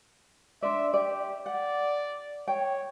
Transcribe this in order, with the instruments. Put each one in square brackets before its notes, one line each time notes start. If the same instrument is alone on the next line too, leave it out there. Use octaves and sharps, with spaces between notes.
[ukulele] D4 C5 D5 [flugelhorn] E5
[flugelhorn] G4 [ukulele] D5
[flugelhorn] D5 [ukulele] F#5
[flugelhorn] C#5 [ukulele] G5